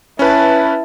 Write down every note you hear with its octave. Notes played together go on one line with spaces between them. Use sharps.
C#4 E4 B4 A5